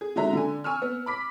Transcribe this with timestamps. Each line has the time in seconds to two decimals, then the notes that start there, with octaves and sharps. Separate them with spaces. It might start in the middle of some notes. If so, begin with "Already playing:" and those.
0.01 G#4
0.16 D3 G#3 D#4 F#4 E5 A#5
0.33 D3 G#5
0.64 G#5 C#6 E6 F6
0.82 B3
1.06 B5 D6 B6